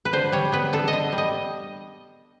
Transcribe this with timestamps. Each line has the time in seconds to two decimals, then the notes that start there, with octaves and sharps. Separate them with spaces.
0.05 B4
0.13 D3 C5
0.32 G3 C#5
0.52 B3 B4
0.73 D3 A4
0.88 D#5
0.93 D3
1.12 G3
1.18 D#5